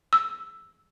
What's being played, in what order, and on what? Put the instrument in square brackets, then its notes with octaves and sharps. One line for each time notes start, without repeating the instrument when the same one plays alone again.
[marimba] E6